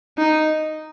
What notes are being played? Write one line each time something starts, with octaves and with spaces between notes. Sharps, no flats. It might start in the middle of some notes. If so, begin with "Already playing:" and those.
D#4